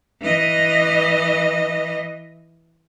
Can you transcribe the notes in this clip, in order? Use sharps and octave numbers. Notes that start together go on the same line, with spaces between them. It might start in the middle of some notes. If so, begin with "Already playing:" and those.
E3 D#5